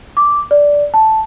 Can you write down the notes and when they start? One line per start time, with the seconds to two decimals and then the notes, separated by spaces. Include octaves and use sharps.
0.17 D6
0.51 D5
0.94 A5